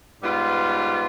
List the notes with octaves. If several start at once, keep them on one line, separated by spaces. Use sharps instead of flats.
G#2 G3 B3 F4 B4